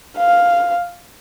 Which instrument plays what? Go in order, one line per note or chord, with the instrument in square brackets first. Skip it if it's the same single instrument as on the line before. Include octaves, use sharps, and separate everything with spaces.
[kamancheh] F5